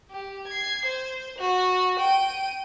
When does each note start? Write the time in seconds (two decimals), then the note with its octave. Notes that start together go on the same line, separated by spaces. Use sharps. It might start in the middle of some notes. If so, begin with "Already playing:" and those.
0.11 G4
0.48 G#6 C7
0.85 C5
1.38 F#4
1.99 G5 D#7